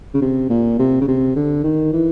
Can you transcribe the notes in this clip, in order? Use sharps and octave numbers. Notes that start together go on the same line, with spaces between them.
C#3
C3
A#2
C3
C#3
C3
D3
D#3
E3